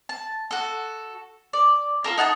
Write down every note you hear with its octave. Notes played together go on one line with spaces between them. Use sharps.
A5
F#4 A4
D5
F4 A4 A#4
D#4 F#5 G#5 A5